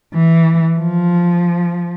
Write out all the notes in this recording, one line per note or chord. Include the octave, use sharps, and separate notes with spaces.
E3
F3